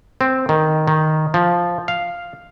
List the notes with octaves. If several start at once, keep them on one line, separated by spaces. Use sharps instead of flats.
C4
D#3
D#3
F3
F5